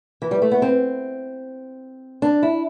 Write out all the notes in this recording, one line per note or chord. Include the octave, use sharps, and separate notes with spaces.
E3
G3
A3
B3
C4
D4
E4